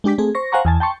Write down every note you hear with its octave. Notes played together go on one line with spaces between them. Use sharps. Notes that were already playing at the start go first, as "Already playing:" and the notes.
G#3 D4 G4 D6 B6
A3 C4 G#4
C5 C#6 A#6
C5 F5 F#5 G#5 A#5 C#6
E2 G#5 A5
G5 A5 C6 C#6